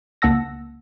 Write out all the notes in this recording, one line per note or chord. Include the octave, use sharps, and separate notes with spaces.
C#2 A#3 F#5 A5 E6 A#6